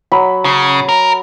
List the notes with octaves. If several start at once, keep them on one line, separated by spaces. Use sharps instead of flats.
F#3 B5
C#3
A#4